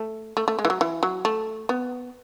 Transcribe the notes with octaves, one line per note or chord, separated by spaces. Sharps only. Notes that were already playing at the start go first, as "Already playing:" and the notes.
Already playing: A3
A3
A3
G#3
E3
F#3
E3
F#3
A3
B3